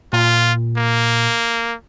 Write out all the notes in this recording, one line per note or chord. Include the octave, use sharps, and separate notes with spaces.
A#2 F4
A#3